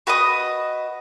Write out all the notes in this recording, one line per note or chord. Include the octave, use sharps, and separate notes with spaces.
F#4 B4 D#5 D#6